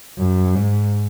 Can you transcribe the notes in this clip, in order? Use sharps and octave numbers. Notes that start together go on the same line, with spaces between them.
F#2
G#2